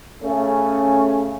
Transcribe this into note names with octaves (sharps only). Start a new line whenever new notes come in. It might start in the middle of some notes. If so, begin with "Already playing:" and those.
C#3 A3 C#4